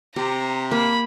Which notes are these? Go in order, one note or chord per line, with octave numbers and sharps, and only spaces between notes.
C3 G4 A#5
A#3 B5